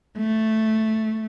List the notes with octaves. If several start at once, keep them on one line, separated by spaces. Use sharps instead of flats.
A3